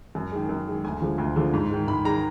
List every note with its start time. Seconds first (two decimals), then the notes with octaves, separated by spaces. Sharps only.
0.15 F#2
0.32 D#3 G#3
0.49 F#2
0.67 D#3 G#3
0.84 D2 G#5
1.01 D3 F3 G#3
1.18 D2
1.36 D3 F3 G#3
1.54 G#2
1.71 D#3 G#3
1.88 G#2 B5
2.05 D#3 G#3 A#5